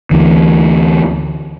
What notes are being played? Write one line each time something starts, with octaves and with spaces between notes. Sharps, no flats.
D2 E3